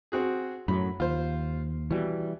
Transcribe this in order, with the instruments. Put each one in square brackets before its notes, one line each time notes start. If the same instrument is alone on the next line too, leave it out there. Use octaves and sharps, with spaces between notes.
[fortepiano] C4 F#4 G#4
[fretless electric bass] F#2 A2 F#3 [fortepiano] B5
[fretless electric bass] D#2 [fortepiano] F4 C5
[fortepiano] B2 [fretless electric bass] E3 G3